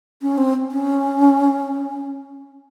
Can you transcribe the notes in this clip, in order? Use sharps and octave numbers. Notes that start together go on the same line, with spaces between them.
C#4
C4
C#4